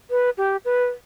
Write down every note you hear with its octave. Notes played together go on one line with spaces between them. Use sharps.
B4
G4
B4